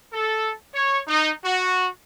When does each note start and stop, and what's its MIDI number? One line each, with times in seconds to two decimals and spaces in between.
0.13 0.52 69
0.74 0.99 73
1.07 1.31 63
1.45 1.88 66